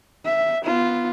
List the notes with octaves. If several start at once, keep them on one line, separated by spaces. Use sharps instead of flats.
E5
B3 F4